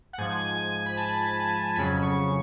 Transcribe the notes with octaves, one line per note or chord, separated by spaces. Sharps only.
F#5
G#2 F3 G#5
B5
A5
F2 C#3 F#3 B5
C#6